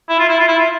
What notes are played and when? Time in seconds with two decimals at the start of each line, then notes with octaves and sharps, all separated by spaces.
0.09 E4
0.19 F4
0.29 E4
0.39 F4
0.48 E4
0.59 F4